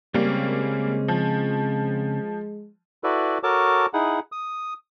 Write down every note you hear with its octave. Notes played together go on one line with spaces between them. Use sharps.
C#3 G3 G#3 A#3 C4 C#4
F3
E4 F#4 A4 B4 D5
F#4 A4 A#4 C#5 A5 D6
D#4 E4 G#4 F#5
D#6